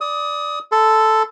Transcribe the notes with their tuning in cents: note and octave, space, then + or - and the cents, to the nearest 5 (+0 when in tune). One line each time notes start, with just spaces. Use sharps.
D5 +0 D#6 +25
A4 +0 C6 -35